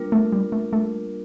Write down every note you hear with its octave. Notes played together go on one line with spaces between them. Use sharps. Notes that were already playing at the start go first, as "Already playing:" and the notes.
Already playing: G3 A#3 D4 F4 A#4
A3
G3
A3
A3